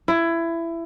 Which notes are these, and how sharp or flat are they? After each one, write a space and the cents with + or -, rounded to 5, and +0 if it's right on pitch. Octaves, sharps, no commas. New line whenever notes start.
E4 +20